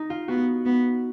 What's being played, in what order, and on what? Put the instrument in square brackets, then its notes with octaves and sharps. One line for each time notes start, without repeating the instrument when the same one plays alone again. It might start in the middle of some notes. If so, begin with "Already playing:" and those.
Already playing: [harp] D#4
F4
[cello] B3 [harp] F#4
[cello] B3